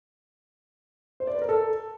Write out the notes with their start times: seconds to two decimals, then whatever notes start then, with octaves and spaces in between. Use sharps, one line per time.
1.20 C5
1.27 D5
1.34 B4
1.42 A#4
1.49 A4